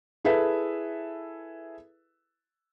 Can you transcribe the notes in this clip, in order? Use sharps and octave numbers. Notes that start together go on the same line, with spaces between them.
E4 G#4 A4 B4 E5